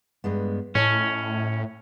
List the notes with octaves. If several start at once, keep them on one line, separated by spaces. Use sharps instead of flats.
G2 G#3 B3
A2 C#4 C#5 D#5 A5